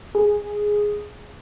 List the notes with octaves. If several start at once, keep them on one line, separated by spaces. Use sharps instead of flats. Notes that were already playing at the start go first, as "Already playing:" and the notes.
G#4